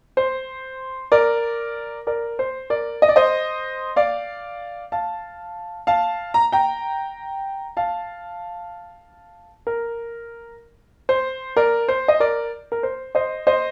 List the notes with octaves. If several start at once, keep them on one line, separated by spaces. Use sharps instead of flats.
C5
A#4 D5
A#4 D5
C5
A#4 D5
D#5
D5
C5 D#5
D5 F5
F5 A5
F5 A5
A#5
G5 A#5
F5 A5
A#4
C5
A#4 D5
C5
D#5
A#4 D5
A#4
C5
C5 D#5
C5 D#5